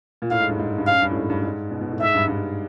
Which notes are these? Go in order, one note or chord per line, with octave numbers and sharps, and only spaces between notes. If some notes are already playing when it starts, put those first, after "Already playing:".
A#2
A2 F5
G#2
G2
G#2
G2
F#2 F5
G2
A2
G#2
G2
G#2
B2
B2
A2
G#2 E5
G2
G2